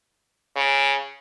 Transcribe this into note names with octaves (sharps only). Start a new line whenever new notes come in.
C#3